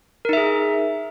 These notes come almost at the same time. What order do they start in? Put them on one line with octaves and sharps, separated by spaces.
A#4 D#4 E5 G#4